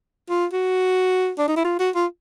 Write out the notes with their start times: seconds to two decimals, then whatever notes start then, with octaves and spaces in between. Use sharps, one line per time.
0.30 F4
0.53 F#4
1.38 D4
1.48 D#4
1.57 E4
1.65 F4
1.79 F#4
1.95 F4